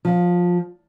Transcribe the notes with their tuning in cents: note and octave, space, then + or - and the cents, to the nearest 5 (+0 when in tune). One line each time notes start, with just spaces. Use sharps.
F3 +15